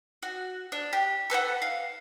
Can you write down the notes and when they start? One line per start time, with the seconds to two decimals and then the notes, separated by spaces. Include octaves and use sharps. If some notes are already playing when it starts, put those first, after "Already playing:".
0.23 F#4
0.72 D4
0.93 G4
1.30 A4 B4 C5 F#5
1.62 F5